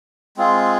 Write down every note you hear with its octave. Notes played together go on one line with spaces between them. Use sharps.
G#3 C4 F4 G#4